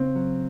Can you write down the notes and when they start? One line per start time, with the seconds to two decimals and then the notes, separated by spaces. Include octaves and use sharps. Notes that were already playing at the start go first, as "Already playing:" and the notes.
Already playing: C#3 C4
0.15 F#3